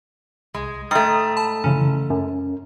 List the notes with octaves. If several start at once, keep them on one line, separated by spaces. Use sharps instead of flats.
C2 G#3
G#2 A3 G5 A#5 D#6
A5 B5
F#2 C#3 E3 C#4
F#2 C#4